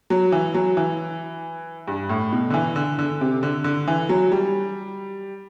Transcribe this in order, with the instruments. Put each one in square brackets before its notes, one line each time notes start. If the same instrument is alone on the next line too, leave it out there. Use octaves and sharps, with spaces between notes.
[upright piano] F#3
E3
F#3
E3
G2
A2
B2
D3
E3
D3
D3
C3
D3
D3
E3
F#3
G3